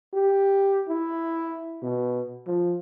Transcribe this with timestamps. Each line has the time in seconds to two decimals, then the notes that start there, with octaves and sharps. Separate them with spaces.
0.14 G4
0.89 E4
1.83 B2
2.47 F3